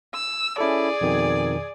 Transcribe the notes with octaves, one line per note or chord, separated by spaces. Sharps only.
E6
C#4 E4 G#4 A4 D5
F2 B2 D#3